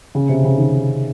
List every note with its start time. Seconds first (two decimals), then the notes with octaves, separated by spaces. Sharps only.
0.15 C#3
0.29 C3
0.44 C#3
0.58 D#3